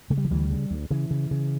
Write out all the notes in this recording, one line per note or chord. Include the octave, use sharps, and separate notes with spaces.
C#3 A3
G3
F3
D2 E3 G3
C#3
D2
C#3 E3
C#3
C#3